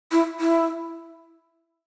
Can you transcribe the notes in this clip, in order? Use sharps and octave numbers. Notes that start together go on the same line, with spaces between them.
E4
E4